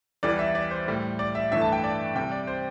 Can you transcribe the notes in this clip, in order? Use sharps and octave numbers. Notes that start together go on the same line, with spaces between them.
E2 E3 G3 D5
E5
D5
C5
A2 G3
D5
E5
G2 E3 A3 E5
A5
G5
D5
C3 G3 G5
D5
C5